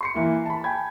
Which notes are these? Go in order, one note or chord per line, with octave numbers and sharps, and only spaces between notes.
C6 C7 C#7
E3 A#3 E4
A5 B5
G5 G#5 B5 G#6